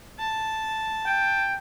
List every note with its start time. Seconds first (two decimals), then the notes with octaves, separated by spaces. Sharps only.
0.19 A5
1.06 G5